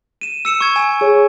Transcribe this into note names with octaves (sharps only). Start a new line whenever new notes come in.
D#7 E7
E6 C#7 E7
C#6 G#6
G#5
G#4 C#5